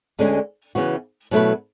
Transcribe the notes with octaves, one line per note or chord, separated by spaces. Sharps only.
D2 D3 G#3 C#4 G#4
C#3 E3 B3 F#4
B2 F#3 A3 E4 B4